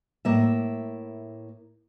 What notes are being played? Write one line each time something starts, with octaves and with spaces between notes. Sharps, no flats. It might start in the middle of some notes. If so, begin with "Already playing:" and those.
A2 A#3 E5